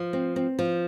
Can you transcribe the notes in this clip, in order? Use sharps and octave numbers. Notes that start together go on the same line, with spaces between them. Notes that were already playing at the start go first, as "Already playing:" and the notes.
Already playing: F3
C4
C4
F3